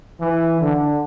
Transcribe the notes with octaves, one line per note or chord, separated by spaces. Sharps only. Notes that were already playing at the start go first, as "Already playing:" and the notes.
E3
D3